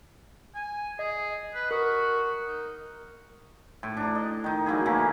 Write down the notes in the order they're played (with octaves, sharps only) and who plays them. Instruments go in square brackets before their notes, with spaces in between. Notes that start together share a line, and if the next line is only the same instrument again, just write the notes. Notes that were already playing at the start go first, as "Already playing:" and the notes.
[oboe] G#5
[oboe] G#4 [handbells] D#5
[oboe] B4
[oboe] F#4 [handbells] A#4 D#6
[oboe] D#4
[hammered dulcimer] A2
D4 A#5
D#5
D#3 D#4
F#3 A#3 E4 G#4
C#3 E3 A3 A#3